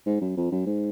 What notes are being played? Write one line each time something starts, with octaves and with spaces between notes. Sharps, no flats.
G#2
F#2
F2
F#2
G#2